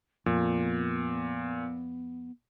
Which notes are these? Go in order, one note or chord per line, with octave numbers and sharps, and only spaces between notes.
F2 A#2 B3